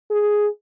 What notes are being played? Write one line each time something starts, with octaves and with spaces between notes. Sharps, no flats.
G#4